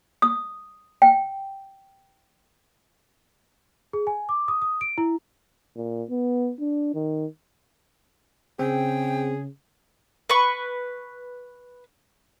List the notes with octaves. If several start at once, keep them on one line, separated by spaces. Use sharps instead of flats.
D#6
G5
G#4
G#5
D6
D#6
D#6
D7
E4
A#2
B3
D4
D#3
C#3 C4 G#4 G5
B4 C#6